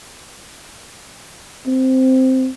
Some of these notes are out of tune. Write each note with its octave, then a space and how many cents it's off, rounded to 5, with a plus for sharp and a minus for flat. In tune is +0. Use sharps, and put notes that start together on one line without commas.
C4 -5